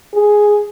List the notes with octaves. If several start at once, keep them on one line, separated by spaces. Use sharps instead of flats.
G#4